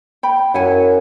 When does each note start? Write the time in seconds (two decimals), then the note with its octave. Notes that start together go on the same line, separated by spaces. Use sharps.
0.23 G5 B5
0.54 F#2 E4 F#5 G#5